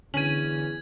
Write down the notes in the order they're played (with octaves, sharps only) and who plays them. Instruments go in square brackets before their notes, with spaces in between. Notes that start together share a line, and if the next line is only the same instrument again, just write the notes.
[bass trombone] E2 [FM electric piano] D3 [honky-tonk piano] C#4 D#7 [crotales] G#6 F#7